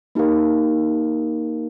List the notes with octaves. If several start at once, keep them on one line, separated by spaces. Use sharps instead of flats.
A#3 D#4 G4 A#4 F5